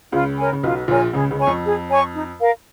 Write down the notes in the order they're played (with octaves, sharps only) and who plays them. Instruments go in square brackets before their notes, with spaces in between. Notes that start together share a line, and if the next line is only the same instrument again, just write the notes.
[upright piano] C#2 C#3 [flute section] F4
[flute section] A#4 C#5 G#5
[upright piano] C#3
[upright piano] B1 B2 [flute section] F4
[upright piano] A#1 A#2 [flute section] A#4 C#5 G#5
[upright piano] C#2 C#3 [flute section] G#4
[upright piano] C#2 C#3
[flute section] C#5 G#5 C#6
[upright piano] F2
[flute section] G#4
C#5 G#5 C#6
D#4
A#4 F5